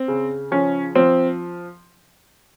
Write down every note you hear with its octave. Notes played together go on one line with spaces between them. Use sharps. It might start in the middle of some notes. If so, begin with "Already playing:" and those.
Already playing: C4
C#3
F3 C#4
F3 C4